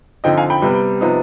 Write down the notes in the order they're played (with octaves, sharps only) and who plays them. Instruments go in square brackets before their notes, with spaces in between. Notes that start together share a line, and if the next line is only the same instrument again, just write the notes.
[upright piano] D3 F3 C4 D#4 D#5 G5
F5 G#5
G5 B5
C3 G3 B3
C3 F3 B3 D#4